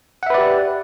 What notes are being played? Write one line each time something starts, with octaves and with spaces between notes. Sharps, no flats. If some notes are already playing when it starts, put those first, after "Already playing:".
G4 B4 D5 E5 F#5